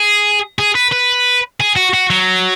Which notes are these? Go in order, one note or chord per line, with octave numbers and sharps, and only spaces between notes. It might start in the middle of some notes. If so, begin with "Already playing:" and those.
Already playing: G#4
G#4
B4
B4
G#4
F#4
F#4
F#3